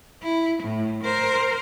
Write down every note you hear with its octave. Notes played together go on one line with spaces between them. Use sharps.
E4
A2
A#4 C5